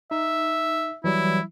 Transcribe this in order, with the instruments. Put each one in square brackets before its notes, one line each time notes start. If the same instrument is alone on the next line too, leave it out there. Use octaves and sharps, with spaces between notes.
[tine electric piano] D#4 [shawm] E5
[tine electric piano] E3 F#3 G3 [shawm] E4